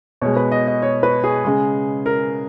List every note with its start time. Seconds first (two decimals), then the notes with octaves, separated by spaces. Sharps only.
0.21 B2 G#3 C#5
0.36 B4
0.52 D#5
0.68 D#5
0.82 C#5
1.03 B4
1.24 G#4
1.44 C#3 G#3
2.06 A#4